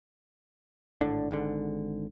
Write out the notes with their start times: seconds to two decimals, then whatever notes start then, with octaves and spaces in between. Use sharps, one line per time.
1.01 G#1 A2 D3 D4
1.31 G#1 G#2 D3